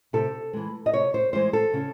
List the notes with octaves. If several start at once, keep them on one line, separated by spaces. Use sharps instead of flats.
C3 A4
E3 G#3
D#5
C3 C#5
C5
E3 G#3 C5
A4
C#3